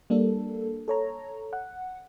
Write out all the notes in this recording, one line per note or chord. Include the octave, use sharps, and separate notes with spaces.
G3 A#3 D4 A4
A4 C#5 A#5
F#5